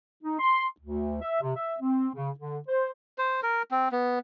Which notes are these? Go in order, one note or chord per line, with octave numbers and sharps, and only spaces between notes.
D#4
C6
D2
E5
C3
E5
C4
C#3
D3
C5
C5
A#4
C4
B3